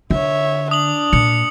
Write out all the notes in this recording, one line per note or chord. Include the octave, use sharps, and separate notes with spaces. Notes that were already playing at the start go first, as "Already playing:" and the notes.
D3 C#5 E5
D4 D#6 F#7
A#2 C#7